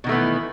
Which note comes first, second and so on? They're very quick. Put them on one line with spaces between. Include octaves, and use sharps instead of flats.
B2 D#3 A3 B3 E3